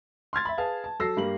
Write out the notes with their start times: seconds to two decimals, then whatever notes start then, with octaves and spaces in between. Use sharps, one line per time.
0.33 C6 F6 G#6 A6
0.45 E5 B5
0.57 G#4 B4 F5 A5
0.84 A5
1.00 F#3 A4 E6 A#6 C7
1.17 G2 G3 A#3 F#7